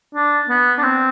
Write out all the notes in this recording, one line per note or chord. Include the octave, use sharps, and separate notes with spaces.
D4
B3
D4
C4